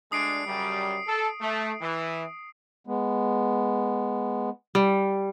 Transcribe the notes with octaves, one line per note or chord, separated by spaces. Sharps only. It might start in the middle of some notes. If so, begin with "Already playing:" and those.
D2 G#3 D4 D#6 C7 D7
F#2 C#3 G3
A4
A3
E3
G#3 B3
G3